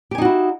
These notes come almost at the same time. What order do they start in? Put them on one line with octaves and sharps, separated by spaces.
G4 G#5 D#4 F#4 E4